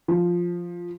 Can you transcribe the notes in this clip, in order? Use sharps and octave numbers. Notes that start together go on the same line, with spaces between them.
F3